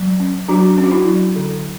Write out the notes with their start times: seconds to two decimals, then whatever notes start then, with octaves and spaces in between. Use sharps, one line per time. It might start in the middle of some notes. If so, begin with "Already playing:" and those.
Already playing: F#3
0.20 C#4
0.49 F#3 D4 F#4
0.78 C#4
0.84 F#4
0.92 E4
1.06 F#3
1.36 D3